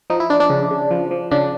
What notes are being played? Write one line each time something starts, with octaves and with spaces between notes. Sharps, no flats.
F3 D#4
E4
F3 D4
D4
C#3
C#3
F3
F3
C#3 D4